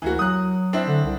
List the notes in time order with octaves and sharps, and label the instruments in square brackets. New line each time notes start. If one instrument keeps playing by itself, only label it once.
[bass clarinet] D2 [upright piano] E3 A#3 F#4
[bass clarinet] F#3 [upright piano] D#6 F#6
[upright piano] C4 D4 E4
[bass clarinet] D3
C2